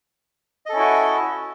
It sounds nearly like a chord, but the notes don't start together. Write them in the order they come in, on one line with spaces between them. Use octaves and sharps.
D#5 A4 C#4 E4 F#4